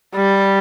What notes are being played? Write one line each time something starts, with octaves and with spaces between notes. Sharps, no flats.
G3